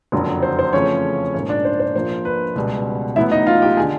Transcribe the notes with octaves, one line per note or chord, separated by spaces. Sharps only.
F#1 F2 D3 F#3
C5
C5
E2 C#3 F3 A3 C4 C#4 C#5
A#1 G#2 F3 A#3 C#4 C#5
D4 D5
C5
C5
A#1 A#2 F3 A#3 C5
B4
C#2 B2 G3 B3
A1 A2 F#3 B3 E4 E5
D#4 D#5
F4 F5
G4 G5
G#4 G#5
D3